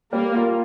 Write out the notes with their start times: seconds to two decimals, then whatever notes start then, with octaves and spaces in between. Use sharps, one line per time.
0.13 G3 A#3
0.35 F4